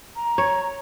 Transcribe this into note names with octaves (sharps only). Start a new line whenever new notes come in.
A#5
C#5